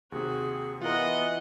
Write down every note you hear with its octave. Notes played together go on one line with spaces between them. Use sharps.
D#2 C3 F#4 G#4
E3 B3 F4 A#4 D#5 F#5